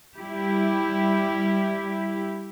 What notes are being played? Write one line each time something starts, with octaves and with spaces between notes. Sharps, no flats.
G3 E4 G4